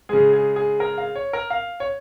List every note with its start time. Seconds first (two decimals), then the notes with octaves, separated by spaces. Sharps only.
0.09 C#3 G#3 G#4
0.33 G#4
0.56 G#4
0.80 A#4
0.98 F5
1.15 C#5
1.33 A#4
1.50 F5
1.80 C#5